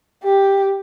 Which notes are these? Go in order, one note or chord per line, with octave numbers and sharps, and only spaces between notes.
G4